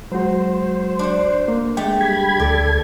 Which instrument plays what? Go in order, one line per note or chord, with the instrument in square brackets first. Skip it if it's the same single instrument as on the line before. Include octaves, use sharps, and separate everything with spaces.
[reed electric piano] F#3 G#3 F#4 [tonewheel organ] C5
[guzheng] D4 F#5
[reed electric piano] A#3
[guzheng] G#3 A3 G4 [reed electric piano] G5
[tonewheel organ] G3 B5 G#6
[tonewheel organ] D2 A4 G#6 [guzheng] D5